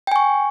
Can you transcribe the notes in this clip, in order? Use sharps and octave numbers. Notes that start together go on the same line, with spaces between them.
G5 G#5 C#6